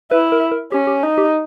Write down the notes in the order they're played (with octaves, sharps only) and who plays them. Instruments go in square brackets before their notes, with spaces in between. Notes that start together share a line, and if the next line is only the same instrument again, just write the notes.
[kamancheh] E4 [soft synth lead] B4
[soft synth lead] A#4
A#4
[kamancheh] C#4 [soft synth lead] G4
[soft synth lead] G4
[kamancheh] D#4
[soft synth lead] G4